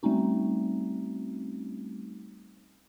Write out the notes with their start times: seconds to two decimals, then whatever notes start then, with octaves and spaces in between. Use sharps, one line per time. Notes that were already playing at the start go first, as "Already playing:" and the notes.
0.03 G3 A3 C4 C#4 D#4 F#4